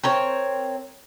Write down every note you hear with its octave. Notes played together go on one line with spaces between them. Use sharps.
C4 A#4 C#5